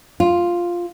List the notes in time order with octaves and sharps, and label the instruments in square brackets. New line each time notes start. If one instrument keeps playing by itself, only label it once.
[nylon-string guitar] F4